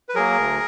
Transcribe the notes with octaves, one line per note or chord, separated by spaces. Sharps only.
B4
F#3 A#3 G#4 A#4
D2